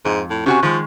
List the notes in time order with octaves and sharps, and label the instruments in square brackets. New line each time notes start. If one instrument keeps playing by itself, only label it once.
[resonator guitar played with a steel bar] F2 [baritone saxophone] G#2
[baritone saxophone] A2
[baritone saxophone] C3 [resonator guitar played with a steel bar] C#4 F#4 G#5
[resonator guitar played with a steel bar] D#3 G#3 [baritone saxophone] F3